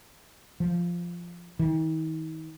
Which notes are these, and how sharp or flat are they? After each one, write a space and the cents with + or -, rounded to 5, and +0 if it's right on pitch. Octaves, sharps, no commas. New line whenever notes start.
F3 -5
D#3 +40